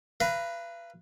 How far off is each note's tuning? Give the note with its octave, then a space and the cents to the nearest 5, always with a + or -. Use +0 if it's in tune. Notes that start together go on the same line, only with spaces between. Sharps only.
B4 +0 F5 -40 A#5 +0